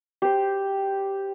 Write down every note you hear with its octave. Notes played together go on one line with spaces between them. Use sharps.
G4 C5